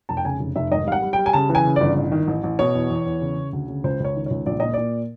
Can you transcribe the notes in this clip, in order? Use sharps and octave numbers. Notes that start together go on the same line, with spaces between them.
F1 A5
G5
C#3 G#5
F1
F1 E5
G#1 D#5
G3 F5
F#5
G3
G5
G3
G#5
C#3 A5
E3
G#5
C#3
G1 D5
A1
D#3
A1
A1
B2 C#5
E2
E2
E2
C#3
C#3
D2
C#3
C#2 C5
C#2 C#5
D#3
C#2 C#5
A#1 D5
A#2 D#5
A#2 D5